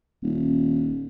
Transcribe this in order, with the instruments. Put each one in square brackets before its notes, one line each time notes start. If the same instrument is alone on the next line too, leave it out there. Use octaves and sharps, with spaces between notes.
[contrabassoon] D#1